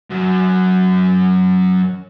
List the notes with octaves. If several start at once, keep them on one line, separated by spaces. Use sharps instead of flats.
F#2 F#3